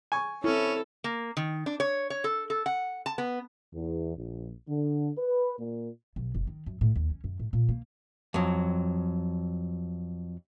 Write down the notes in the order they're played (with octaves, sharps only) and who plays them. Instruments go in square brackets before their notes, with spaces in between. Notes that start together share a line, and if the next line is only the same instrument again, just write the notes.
[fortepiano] G#5 C#6
[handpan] C4 E4 [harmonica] C#4 [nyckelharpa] A4
[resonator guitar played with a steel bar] A#3
D#3
D4
C#5
C#5
A4
A4
F#5
A5
B3
[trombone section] E2
A#1
D3
B4
A#2
[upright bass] B1
F#1
D#3
F#2
A2
D#2
C#4
F#2
A2
A#2
A#3
[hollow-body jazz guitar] F2 F#3